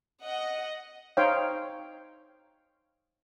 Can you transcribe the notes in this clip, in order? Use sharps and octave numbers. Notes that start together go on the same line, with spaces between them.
D#5 F#5
D#4 C5 C#5 F5 G5